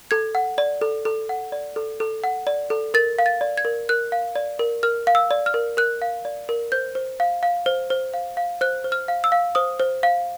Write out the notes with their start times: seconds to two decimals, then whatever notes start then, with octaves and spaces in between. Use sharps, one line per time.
0.11 A4 G#6
0.35 F#5
0.58 D5
0.81 A4
1.05 A4
1.29 F#5
1.52 D5
1.76 A4
2.00 A4
2.24 F#5
2.47 D5
2.70 A4
2.94 A#4 A6
3.19 F5
3.26 A6
3.41 D5
3.58 G#6
3.65 A#4
3.89 A#4 F#6
4.12 F5
4.35 D5
4.59 A#4
4.83 A#4 F6
5.07 F5
5.15 E6
5.31 D5
5.46 F6
5.54 A#4
5.77 A#4 F#6
6.02 F5
6.25 D5
6.49 A#4
6.72 C5 G6
6.95 C5
7.20 F5
7.43 F5
7.66 C5
7.90 C5
8.14 F5
8.37 F5
8.61 C5 F#6
8.84 C5
8.92 F6
9.08 F5
9.24 E6
9.32 F5
9.55 C5 D#6
9.80 C5
10.03 F5